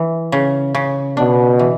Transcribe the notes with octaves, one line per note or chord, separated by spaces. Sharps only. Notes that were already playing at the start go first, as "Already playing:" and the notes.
Already playing: E3
C#3
C#3
B2 D4
E3